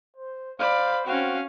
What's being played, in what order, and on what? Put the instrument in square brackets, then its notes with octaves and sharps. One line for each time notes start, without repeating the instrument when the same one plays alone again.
[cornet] C5
[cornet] C5 [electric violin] D5 B5 [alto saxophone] F5
[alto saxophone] C4 [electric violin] C#4 F5 [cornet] F#4